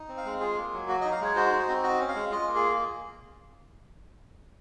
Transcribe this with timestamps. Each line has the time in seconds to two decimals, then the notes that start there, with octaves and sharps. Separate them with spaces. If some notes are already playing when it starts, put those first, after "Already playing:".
Already playing: D#4
0.09 C4
0.17 F5
0.25 G#3
0.40 F4 G#4
0.57 A#3
0.73 F#3
0.88 F#4
1.01 D#5
1.05 D#4
1.12 F5
1.21 G#3 C#5
1.36 F#4 C5
1.52 D#4
1.69 C4
1.84 F#4 D#5
2.00 C#4
2.08 F5
2.15 G#3
2.31 F4 D#5
2.47 A#3
2.55 G#4